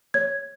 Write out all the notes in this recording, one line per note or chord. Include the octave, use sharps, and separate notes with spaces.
C#5 G#6